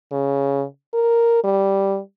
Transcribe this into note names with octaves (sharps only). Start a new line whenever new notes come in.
C#3
A#4
G3